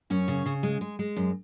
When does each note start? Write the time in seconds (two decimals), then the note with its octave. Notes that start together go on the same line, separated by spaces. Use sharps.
0.10 F#2 C#4 C#5
0.28 C#3
0.46 C#3
0.63 G#3
0.81 G#3
0.99 G#3
1.16 F#2